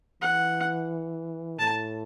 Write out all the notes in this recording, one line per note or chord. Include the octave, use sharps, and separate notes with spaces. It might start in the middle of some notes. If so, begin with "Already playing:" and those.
E3 F#5
A2 A5